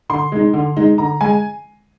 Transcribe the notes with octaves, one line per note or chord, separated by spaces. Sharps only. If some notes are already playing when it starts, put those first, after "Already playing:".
D3 C6
G#3 D#4
D3
G#3 D#4
D3 A#5
G#3 G#5